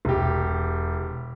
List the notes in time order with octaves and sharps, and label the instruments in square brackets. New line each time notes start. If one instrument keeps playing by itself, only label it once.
[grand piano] E1 G4